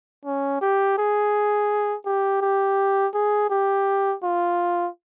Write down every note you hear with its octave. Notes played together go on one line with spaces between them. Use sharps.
C#4
G4
G#4
G4
G4
G#4
G4
F4